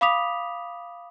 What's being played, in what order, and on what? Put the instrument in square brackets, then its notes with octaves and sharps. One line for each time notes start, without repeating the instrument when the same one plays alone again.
[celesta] F5 B5 D6 D#6 B6 F7